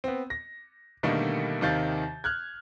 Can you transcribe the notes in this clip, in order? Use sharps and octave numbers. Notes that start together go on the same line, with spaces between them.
B3 C4
A#6
B2 D3 D#3 G3 A3 A#3
D#2 C3 D#3 F5 G6 A6
F6 F#6 G#6